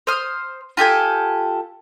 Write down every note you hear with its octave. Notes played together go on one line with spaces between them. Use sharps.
C5 C6 D#6 F6
F4 G4 A4 G#5